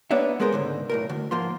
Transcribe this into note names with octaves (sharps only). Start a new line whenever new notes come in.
A#3 B3 D4 C#5 E5
G#3 B3 G#4 A#4 C5
C#2 G#2 D3
B1 A2 A#4
D2
G#2 F3 A#3 F4 C6